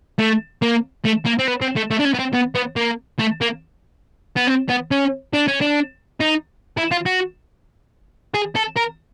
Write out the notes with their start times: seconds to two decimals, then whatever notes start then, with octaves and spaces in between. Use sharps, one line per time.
0.19 A3
0.62 A#3
1.05 A3
1.26 A#3
1.39 C4
1.48 B3
1.61 C4
1.76 A3
1.91 A3
1.99 D4
2.05 C#4
2.14 B3
2.19 C4
2.34 B3
2.55 B3
2.76 A#3
3.19 A3
3.41 A#3
4.37 B3
4.48 C4
4.70 B3
4.91 C#4
5.33 D4
5.47 C#4
5.61 D4
6.20 D#4
6.77 E4
6.91 F4
7.06 F#4
8.34 G#4
8.56 A4
8.77 A#4